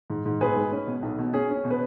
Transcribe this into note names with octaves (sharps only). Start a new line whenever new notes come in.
G#2
G#2
B1 G#4 B4
G#3
C#4
B2
B1
B2
C#4 G#4
C#4
B2
B4